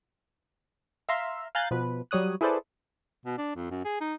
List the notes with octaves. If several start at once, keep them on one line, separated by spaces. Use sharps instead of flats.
E5 F5 A#5 C6 E6
F5 G#5 A#5 F#6 G6 A6
B2 F3 B4
F#3 G3 C#5 D#6 F#6
E4 G#4 A4 B4 C5 D5
B2
D4
F2
F#2
G#4
D#4